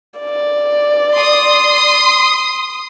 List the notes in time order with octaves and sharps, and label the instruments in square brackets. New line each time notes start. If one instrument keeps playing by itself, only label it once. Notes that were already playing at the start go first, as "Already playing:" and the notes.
[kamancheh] D5
[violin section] C6 D#6